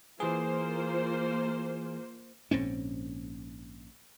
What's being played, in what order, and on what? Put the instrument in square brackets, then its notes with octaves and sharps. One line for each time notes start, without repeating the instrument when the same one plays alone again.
[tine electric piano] E3 G#4 [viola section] A#3 F4 C5
[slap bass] A#1 G#2 C4 C#4